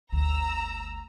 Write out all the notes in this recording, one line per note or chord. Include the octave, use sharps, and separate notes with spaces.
G1 D2 A#5 E6